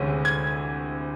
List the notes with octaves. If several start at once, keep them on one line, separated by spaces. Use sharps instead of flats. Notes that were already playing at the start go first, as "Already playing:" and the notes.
Already playing: D2 C3 E3 G#3 C#4
G#6